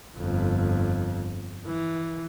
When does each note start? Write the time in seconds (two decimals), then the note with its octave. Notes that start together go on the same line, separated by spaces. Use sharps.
0.17 G1 F2
1.67 E3